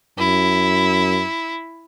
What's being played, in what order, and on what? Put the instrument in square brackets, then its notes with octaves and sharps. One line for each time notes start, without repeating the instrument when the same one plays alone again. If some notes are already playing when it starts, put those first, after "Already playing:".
[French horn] F#2 [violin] E4